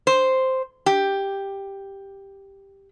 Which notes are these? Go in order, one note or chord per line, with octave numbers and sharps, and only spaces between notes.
C5
G4